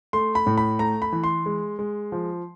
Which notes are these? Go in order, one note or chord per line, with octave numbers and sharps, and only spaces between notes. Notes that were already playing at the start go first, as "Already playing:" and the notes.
A3 C6
B5
A2
B5
A3 A#5
B5
E3
C6
G#3
G#3
F3